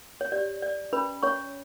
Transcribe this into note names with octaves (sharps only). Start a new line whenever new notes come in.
C#5
G4 D5
C#5 D5
C#4 B4 B5
C#4 C#5 C#6